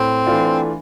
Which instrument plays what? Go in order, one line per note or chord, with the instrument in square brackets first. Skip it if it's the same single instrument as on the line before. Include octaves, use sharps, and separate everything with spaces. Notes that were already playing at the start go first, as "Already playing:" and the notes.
Already playing: [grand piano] A2 [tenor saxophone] C4
[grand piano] E3 A3 D4 F4